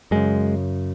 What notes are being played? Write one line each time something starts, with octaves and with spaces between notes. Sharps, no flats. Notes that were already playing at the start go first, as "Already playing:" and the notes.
F#2 C#3 G#3